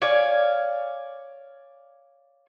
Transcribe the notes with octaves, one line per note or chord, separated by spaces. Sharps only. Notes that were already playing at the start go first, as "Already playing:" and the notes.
C#5 D5 F5 G#5